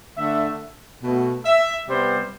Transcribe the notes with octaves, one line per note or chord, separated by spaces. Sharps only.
D3 A3 E5
B2 A3
E5
C3 G3 B3 C5